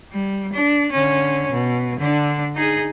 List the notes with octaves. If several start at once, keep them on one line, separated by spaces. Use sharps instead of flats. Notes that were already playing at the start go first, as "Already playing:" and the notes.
G3
D4
D3 C#4
B2
D3 D4
D#4 G#4